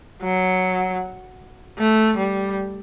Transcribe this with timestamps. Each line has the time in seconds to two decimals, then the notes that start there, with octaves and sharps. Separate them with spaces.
0.23 F#3
1.79 A3
2.18 G3